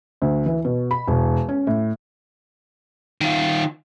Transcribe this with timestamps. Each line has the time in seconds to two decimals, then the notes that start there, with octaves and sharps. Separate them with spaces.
0.22 D2
0.46 E3
0.65 B2
0.91 B5
1.07 E1
1.49 C#4
1.67 A2
3.21 D#3 F4